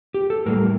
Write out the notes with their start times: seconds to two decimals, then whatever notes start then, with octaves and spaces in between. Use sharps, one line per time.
0.14 G4
0.30 A4
0.46 A2 G3 A#3 A#4